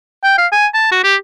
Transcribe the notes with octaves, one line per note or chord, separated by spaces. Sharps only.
G5
F5
G#5
A5
F#4
G4